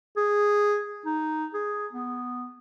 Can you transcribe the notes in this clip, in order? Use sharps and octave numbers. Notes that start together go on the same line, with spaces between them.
G#4
D#4
G#4
B3